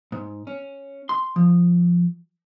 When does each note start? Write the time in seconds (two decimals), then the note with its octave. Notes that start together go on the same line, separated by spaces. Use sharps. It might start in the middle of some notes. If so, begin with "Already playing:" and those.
0.12 G#2
0.47 C#4
1.09 C6
1.36 F3